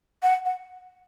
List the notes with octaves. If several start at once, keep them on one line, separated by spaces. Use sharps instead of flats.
F#5
F#5